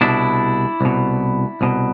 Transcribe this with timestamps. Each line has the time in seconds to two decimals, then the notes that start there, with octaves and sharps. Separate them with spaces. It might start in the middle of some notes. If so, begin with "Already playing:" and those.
0.01 C2 B2 D4 E4
0.81 C2 B2
1.61 C2 B2